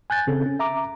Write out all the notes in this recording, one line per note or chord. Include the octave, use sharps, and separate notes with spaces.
G#5 F#6 G6 A6
C#3 C4 A4
C#4
E5 A#5 D6